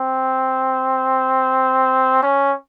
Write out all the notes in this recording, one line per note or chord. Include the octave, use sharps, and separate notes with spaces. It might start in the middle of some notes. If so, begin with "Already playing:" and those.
Already playing: C4
C#4